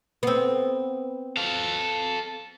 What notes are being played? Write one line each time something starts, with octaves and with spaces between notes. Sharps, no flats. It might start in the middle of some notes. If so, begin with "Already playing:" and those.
B3 C4
A4 F5